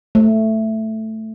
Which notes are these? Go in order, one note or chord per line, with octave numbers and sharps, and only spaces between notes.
A3